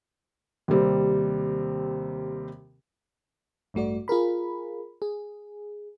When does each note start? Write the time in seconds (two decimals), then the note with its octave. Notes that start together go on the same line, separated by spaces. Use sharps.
0.68 D#2 C3 G3 C4
3.74 A1 G2 A3 F#4 D5
4.08 F4 G#4 A#4 B5
5.02 G#4